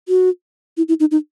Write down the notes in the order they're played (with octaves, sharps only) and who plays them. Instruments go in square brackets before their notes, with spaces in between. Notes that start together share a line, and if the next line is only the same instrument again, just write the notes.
[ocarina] F#4
E4
E4
D#4
D#4